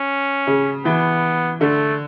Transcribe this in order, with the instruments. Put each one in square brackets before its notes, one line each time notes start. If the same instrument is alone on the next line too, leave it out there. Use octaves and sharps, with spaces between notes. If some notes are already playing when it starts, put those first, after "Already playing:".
Already playing: [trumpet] C#4
[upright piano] C#3
[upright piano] E3 [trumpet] B3
[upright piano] D3 [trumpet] A3